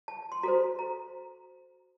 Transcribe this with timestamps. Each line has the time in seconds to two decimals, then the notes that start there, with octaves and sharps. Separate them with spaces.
0.08 A5
0.32 C6
0.43 F#4 A4 C5 A#5
0.79 A#5